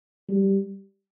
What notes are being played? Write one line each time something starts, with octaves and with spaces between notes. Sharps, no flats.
G3